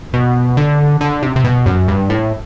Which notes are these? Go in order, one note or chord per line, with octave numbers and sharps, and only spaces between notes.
B2
D3
D3
C3
C3
B2
F#2
G2
A2